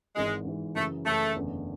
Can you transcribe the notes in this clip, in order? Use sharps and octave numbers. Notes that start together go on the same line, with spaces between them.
G#1 G#2 E3 G#3
G#1 G#2 E3
F#2 C#3 E3 A3
F#2 C#3 E3 A3
F#1 E2 D3 A3